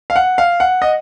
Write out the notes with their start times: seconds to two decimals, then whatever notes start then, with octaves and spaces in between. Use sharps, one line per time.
0.10 F5
0.16 F#5
0.38 F5
0.60 F#5
0.82 D#5